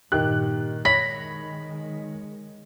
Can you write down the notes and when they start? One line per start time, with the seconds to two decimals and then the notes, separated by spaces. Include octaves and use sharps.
0.12 G2 A#2 D#3 G4 F#6
0.85 D#3 G#3 C#5 B5 A#6